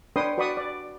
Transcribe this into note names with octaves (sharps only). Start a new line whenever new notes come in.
D4 B4 C#5 G5 C6 D#6
F#4 B4 D5 B5 C#6 D#6
D5